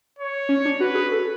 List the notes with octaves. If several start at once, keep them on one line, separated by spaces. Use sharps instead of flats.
C#5
C#4
D4
F#4 B4
G#4
A4